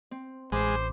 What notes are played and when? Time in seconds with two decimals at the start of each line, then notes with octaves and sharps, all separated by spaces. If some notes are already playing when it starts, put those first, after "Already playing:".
0.11 C4
0.52 A1 G#3 C5 B5 D6